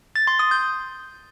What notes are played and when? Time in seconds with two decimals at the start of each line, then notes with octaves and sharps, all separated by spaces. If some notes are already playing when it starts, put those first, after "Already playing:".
0.16 A6
0.27 C6
0.39 D#6
0.51 G6